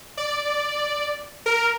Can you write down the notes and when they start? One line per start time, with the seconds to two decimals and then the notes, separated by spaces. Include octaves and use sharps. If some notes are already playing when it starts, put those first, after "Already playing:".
0.17 D5
1.46 A#4